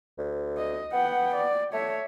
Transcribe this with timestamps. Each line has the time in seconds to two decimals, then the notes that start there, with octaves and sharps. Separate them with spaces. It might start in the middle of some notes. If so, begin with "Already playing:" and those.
0.18 D2
0.58 D#5
0.93 B3 F#5 G5
1.35 D5
1.73 A3 C#5 E5